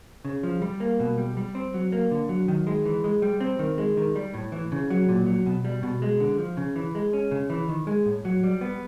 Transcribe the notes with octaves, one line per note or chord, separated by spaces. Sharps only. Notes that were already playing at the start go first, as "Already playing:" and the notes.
C#3
F3
G3
A#3
B2
G3
G3
C4
F#3
A#3
D3
F#3
D#3
G#3
E3
G#3
G3
C4
D#3
G#3
D#3
G3
A2
E3
C#3
F#3
A#2
F#3
B2
G3
B2
G#3
D3
F3
C#3
E3
G#3
C#4
C#3
E3
D#3
G#3
A2
F#3
G3
B3